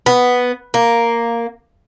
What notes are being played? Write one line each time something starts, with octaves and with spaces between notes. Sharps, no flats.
B3
A#3